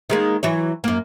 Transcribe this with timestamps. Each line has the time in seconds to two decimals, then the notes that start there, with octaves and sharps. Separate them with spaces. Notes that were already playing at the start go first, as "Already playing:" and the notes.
0.10 D#3 G#3 A#3
0.43 E3 F#3 C#5
0.84 F#2 A#3